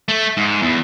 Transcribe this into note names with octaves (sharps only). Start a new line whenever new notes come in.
A3
G#2
E2